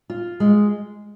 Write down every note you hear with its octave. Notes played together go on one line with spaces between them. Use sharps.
F4
G#3